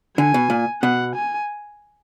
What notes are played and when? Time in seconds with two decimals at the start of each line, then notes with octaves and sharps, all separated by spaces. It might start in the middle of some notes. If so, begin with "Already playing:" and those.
0.17 D3 G#5
0.34 B2
0.50 A#2
0.82 B2 F#5
1.15 G#5